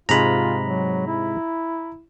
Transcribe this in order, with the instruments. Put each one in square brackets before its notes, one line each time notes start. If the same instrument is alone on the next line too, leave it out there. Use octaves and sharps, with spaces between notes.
[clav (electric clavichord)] G#2 C3 G#3 [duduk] F4 [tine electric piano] A#5 B5
[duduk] F#3
E4